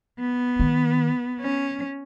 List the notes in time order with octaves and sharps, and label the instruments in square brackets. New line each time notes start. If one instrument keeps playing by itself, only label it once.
[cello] B3
[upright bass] D#3
[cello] C#4